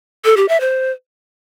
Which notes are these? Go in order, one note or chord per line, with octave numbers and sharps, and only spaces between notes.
A4
G4
E5
C5